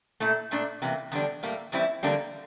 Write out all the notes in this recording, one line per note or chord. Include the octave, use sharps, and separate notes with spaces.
A#2 A3 E4
A#2 A3 D4
C3 E3 A#3
E2 D3 G3 D4
A2 G3 A#3
E2 E3 G3 C4 E4
E2 D3 G3 A#3 D4